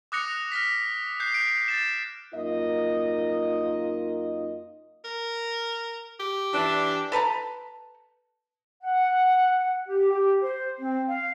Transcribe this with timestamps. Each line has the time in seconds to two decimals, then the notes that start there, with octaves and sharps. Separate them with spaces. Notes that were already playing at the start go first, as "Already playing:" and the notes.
0.12 D6 D#6 F#6 A#6 C#7 F7
0.52 F6 A#6 B6
1.20 F#6 G6 C7
1.32 C7 D7
1.68 A6 E7
2.34 F#2 A#3 D#4 F4 A#4 D#5
5.05 A#4
6.20 G4
6.53 E3 D4
7.12 A4 B4 A5 A#5
8.83 F#5
9.87 G4
10.11 G4
10.42 C5
10.80 C4
11.08 F5